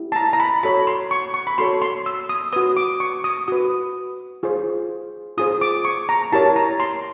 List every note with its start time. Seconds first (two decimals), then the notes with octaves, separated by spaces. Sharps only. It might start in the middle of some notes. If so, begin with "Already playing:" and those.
Already playing: E4 G4
0.12 A5
0.16 A#5
0.33 A#5
0.40 B5
0.63 F#4 A4 C#5 B5
0.87 C6
1.11 C#6
1.34 C#6
1.47 B5
1.58 F#4 A4 C#5 C6
1.82 C6
2.06 E6
2.29 D#6
2.53 F#4 B4 D#6
2.77 D6
3.00 C#6
3.24 D#6
3.48 F#4 B4 D#6
4.43 F4 G#4 C5
5.38 F4 G#4 C5 D#6
5.61 D6
5.85 C#6
6.09 A#5
6.32 E4 G4 A#4 C#5 A5
6.56 A#5
6.80 C6